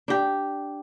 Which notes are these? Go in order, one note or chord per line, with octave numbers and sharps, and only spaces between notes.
D4 G4